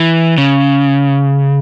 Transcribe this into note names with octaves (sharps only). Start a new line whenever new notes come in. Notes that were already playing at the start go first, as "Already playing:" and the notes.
Already playing: E3
C#3